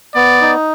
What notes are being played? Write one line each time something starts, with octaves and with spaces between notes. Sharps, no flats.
B3 D5
D#4